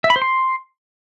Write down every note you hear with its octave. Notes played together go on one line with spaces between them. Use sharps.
E5
B5
C5
C6